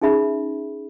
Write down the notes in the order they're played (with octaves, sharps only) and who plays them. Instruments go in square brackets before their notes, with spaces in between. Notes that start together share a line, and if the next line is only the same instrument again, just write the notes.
[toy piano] C#4 D#4 G#4 E5 B5